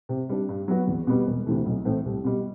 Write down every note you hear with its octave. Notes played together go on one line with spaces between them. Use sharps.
C3
G3 D4
G2
F#3 B3 F#4
E2
B2 G3 B3
E1
D2 C3 E3 A3
B1
A2 E3 A3 C4
C2
B2 G3